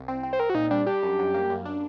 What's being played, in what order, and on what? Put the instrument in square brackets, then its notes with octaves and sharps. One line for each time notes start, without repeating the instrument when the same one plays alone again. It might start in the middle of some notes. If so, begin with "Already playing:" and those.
Already playing: [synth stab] C2
C4
C4
[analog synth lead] C5
[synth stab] C4 [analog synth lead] A#4
[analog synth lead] F#4
[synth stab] A#2 [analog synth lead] D#4
[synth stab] G3 [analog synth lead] D4
[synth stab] D4 [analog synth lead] G4
[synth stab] F#2
F#2
A#3
F#2
D4